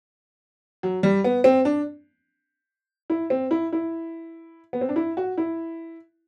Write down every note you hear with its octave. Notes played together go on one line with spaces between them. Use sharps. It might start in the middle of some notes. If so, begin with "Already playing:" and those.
F#3
G3
B3
C4
D4
E4
C4
E4
E4
B3
C4
D4
E4
F#4
E4